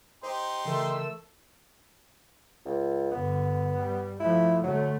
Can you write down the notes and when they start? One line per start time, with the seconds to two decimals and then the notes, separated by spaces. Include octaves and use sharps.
0.23 D#4 G4 C5 C6
0.65 C#3 E3 A3 A#4 E6
2.65 C#2
3.12 G2 D3 B3
3.76 G3
4.20 F3 A3 E4
4.64 D3 F#3 A3